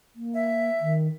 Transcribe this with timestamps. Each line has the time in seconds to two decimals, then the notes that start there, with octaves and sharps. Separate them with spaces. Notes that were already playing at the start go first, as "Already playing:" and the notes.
0.15 A#3
0.34 E5
0.81 D#3